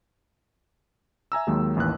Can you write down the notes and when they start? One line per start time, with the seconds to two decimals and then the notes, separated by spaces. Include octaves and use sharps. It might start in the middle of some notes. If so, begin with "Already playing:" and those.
1.32 E5 G#5 A#5 E6
1.47 D#2 D#3 F#3 G#3 A#3
1.76 A1 D#2 E3 B4 F#6